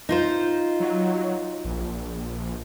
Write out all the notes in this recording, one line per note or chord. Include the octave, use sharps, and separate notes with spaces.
D#4 F4 C5
F#3
A#1